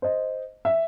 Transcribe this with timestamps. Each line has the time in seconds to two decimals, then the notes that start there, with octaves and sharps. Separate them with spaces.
0.02 C5 D#5
0.65 E5